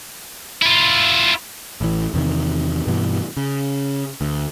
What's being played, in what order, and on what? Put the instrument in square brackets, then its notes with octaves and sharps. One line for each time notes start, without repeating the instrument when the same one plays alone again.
[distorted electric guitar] E4 F4
[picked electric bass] A1 E3
E2 C3 D#3
G2 B2 E3
C#3
D2